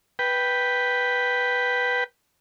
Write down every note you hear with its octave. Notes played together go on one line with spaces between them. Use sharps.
B4 G5